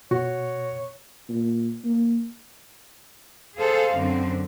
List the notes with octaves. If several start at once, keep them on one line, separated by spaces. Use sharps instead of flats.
B2 F#4 C#5
A#2
A#3
G#4 A4 C5 F5
F#2 D3 C4